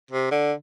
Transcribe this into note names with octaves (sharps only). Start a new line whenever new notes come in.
C3
D3